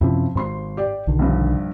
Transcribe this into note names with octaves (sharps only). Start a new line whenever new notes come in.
F#2 C3 F3 C4 C#4 E4
G#1 G#2 C6 C7
G4 D5
B1 D3 D#3
A#1 G2